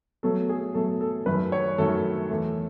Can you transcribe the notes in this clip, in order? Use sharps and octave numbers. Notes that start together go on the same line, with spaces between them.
B2 F#3 A3 A4
G#4
B2 F#3 A3 A4
A4
F#2 D#3 F#3 A3 B4
C#5
F#2 D#3 F#3 A3 A4
E2 B2 A3